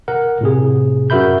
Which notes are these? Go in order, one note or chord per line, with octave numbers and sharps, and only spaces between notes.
A#4 F#5
A2 C3 G#4
F#2 F#4 A#4 E5 B5 G6